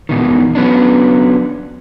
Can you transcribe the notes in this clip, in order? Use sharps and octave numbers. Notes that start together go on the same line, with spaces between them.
E2 B2 D#3
F#3 B3 C#4 D4